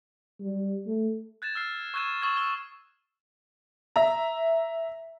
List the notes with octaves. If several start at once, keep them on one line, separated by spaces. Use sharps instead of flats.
G3
A3
F#6 G#6 A6 E7
E6 F6 C7
C#6 E6 F#6 G#6 D#7 E7
C#6 D#6 E6 G#6 A6
E6 G#6 G7
E5 A#5